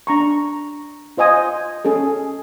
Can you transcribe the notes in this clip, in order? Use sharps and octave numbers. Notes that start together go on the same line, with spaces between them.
D4 A#5 C#6
F4 C5 D#5 G#5 D#6
C#4 G#4 A4